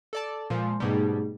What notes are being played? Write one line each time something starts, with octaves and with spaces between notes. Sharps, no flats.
A4 D5 A5
A#2 F3 G#3 C6
G#2 B2 G3 A3 D#4 G#4